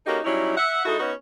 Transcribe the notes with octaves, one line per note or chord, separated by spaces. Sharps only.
A#3 C#4 D#4 F#4 G4 A4
F#3 G3 C#4 D#4 E4
E5 F#5
G#3 D#4 E4 F#4 A4
B3 C#4 D#4 F#4